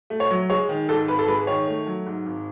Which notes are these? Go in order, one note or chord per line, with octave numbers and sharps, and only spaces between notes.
A3
C#5
F#3
G#3 C#5
D#3
G#2 A4
G#1 B4
A4
G#3 B4
D#3 C#5
A3
F#3
G#2
G#1